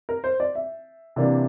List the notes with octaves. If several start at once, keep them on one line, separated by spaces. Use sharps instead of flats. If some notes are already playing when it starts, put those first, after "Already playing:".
A#4
C5
D5
E5
C3 E3 A#3 D4